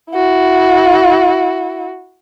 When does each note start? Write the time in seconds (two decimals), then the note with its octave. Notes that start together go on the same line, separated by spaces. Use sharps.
0.11 E4 F#4